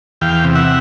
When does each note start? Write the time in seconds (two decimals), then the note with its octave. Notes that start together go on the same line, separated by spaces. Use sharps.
0.21 E2 F5 G5
0.44 C3
0.55 E5 F#5